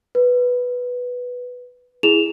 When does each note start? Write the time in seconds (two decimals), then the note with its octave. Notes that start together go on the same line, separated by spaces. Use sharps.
0.15 B4
2.03 E4 G#4 E7 F7